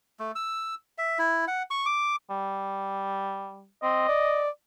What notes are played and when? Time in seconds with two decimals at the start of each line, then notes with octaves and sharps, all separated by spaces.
0.19 A3
0.35 E6
0.98 E5
1.19 E4
1.48 F#5
1.71 C#6
1.86 D6
2.30 G3
3.83 C4 D#5
4.08 D5